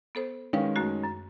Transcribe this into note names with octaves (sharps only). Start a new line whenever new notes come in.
B3 A4 C5
D#3 G#3 C#4 B4 F5 G5
F#2 A3 F#4
F#2